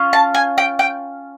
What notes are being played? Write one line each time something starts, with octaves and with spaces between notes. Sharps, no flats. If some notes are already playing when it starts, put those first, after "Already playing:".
Already playing: C#4 F4
A5
G#5
G5
G5